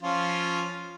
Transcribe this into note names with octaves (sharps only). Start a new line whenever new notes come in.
F3 C#4 F4